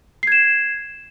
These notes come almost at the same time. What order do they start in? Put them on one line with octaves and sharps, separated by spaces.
C7 G#6 E7